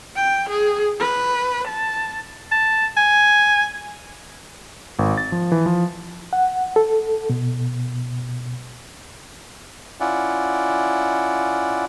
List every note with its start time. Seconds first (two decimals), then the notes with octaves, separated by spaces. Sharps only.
0.16 G5
0.49 G#4
1.00 B4
1.67 A5
2.51 A5
2.97 G#5
4.99 G#1
5.18 A6
5.32 F3
5.52 E3
5.66 F3
6.33 F#5
6.76 A4
7.30 B2
10.00 C#4 E4 F4 D5 F#5